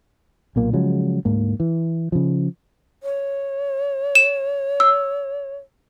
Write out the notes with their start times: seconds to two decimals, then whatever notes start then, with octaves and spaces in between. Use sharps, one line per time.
0.56 B1 A#2 A#3
0.73 C#3 F3 F#3 G#3
1.25 D2 G#2 A#3
1.60 E3
2.12 C#3 F3
3.03 C#5
4.15 E7
4.80 E6